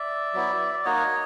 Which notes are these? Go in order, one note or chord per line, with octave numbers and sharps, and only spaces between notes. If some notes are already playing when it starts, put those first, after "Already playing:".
Already playing: D5 E5
F#3 B3 E4
D5
A#3 D#4 F#4 C#5 D#5